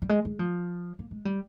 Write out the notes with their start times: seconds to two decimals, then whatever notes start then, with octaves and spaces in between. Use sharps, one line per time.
0.02 G3
0.09 G#3
0.25 G#3
0.39 F3
0.99 A#3
1.11 G#3
1.25 G3